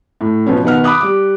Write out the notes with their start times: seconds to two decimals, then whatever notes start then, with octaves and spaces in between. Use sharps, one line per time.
0.21 A2
0.46 B2 F3 B3 C#4
0.64 B2 D#3 B4 F#5 F6
0.84 B5 D6 D#6 F#6
1.01 G3 D6